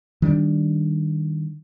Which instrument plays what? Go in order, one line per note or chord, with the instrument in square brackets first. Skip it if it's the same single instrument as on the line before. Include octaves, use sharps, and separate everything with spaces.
[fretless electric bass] D#3 G3 D4